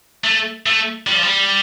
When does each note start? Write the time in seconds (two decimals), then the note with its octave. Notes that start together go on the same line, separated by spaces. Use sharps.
0.24 A3
0.66 A3
1.07 G3
1.15 F3
1.23 G3